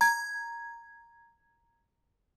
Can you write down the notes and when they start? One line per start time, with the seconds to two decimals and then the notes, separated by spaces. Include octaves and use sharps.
0.01 A#5 G#6